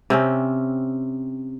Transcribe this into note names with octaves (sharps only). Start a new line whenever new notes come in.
C3 C4 C#4